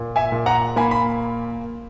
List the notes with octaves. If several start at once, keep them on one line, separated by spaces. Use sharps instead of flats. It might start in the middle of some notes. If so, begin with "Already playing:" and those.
Already playing: A#2
E5 G#5
A#2
F#5 A#5
A#3 G#5 B5
B5